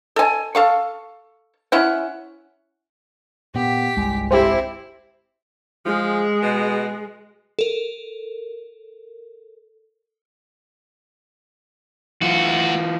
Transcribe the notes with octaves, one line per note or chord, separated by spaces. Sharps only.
A4 G#5
A4 F5 C#6
C#4 E4 F#5
A#2 B3 G4 B6
G1 C2 G#3
C4 E4 G4 C5
F3 G#3 G#4
B2
A4 A#4
E3 A3 F4 F#4